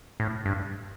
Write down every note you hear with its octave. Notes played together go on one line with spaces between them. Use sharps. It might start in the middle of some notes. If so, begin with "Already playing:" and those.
A2
G2